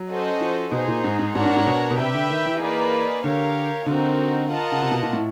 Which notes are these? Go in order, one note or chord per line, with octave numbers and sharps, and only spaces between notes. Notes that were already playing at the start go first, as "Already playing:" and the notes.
Already playing: F#3
C#4 F#4 A4 C5 D#5
F3
B2 D#4 G#4 C5
A#2
G#2
G#2
G#2 D4 F#4 A#4 C#5 F#5
G#2
G#2
B2
B2
C3 G4 B4 E5 G5
D3
D#3
E3
A#3 D#4 G#4 B4 D5
D3 G4 A#4 C#5 F5
D3 C4 D#4 F#4 A#4
F4 A#4 D#5 F#5 A5
C#3
C3
B2
A#2
A2